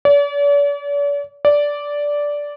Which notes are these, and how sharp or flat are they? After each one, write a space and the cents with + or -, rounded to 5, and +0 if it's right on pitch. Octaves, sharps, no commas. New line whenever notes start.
D5 -45
D5 -10